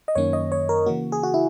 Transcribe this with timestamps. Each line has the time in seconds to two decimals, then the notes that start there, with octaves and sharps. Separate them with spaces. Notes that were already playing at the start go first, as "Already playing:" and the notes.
0.08 D#5
0.15 F#2 D#3 A#3 C#4 C#5
0.33 D#5
0.52 C#5
0.69 A#4
0.86 C#3 E3 A#3 F#4
1.12 G#4
1.23 F#4
1.34 E4